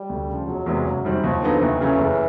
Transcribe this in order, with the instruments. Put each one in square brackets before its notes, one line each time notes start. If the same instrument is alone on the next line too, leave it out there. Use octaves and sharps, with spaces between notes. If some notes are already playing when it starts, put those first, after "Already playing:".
Already playing: [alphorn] G3
[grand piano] D2
C#3 F3
[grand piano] E1 [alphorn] F#3
[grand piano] E2 C3 E3 G#3
F#1
F#2 D#3 G3 C4
[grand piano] D#2 [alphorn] F3
[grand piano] D3 F#3 B3 D#4
[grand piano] D#2 [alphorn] E3
[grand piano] C#3 F#3 A3 C#4
F#1